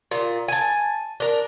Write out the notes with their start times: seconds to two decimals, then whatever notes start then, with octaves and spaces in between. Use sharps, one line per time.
0.11 A#2
0.48 G#5 A5
1.20 D4 A#4